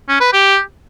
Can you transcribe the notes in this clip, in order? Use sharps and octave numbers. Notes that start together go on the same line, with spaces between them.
C#4
B4
G4